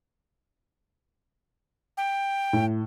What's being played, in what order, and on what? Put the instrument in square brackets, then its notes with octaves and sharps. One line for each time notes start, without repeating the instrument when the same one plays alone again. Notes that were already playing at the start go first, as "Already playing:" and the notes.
[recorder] G5
[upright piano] A2